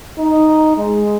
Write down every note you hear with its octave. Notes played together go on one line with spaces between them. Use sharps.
D#4
G#3